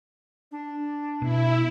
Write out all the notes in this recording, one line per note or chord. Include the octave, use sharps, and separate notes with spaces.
D4
B2 E4